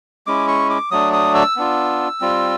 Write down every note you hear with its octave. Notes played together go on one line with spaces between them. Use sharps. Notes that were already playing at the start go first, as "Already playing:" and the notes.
G#3 C#4 E4 D6
C#6
D6
F#3 A3 D4 D#6
D#6
E6
B3 D4 F4
G3 C4 F4